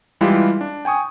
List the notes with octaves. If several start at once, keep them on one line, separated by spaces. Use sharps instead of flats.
E3 G3 G#3 E4 F4 G4
D4
G5 G#5 C#6 D#6